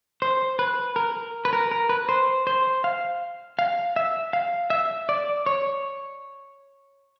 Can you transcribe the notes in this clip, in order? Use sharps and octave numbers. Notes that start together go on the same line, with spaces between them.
C5
B4
A#4
B4
A#4
A#4
B4
C5
C5
F5
F5
E5
F5
E5
D5
C#5